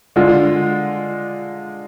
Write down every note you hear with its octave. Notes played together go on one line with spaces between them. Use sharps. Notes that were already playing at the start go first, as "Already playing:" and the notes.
D3 G#3 D4 F4